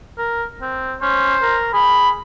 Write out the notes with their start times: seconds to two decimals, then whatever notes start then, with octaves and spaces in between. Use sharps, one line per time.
0.18 A#4
0.62 C4
1.02 C#4 C5
1.42 A#4
1.73 G#4 B5